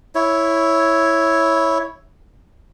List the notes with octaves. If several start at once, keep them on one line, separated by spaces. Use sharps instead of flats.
E4 C#5